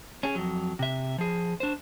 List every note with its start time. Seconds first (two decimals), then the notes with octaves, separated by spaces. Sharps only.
0.23 C#4 G#4
0.35 F2 F#3
0.79 C3 E5
1.18 F3 G#4
1.60 D4 C5